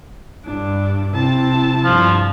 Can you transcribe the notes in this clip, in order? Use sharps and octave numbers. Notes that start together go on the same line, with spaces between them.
G2 D4
C3 C4 E4 A5
G2 F3